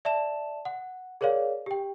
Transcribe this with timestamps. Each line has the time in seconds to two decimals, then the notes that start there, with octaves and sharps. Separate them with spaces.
0.05 D5 E5 A5 E7
0.65 F#5
1.21 G#4 A#4 C#5 D5 F5
1.66 G4 G5